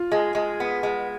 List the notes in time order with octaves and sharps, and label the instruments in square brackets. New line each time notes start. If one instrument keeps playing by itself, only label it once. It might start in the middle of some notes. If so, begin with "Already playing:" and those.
Already playing: [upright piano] F4
[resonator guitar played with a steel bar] G#3
G#3
B3
G#3